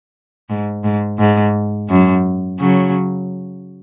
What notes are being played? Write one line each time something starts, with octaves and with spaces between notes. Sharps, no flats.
G#2
G#2
G#2
F#2
C#3 F#3